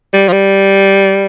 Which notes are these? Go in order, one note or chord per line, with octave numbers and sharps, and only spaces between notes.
G3
F3
G3